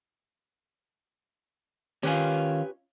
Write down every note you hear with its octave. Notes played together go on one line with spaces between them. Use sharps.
D#3 C#4 F4 G4 B4 G#5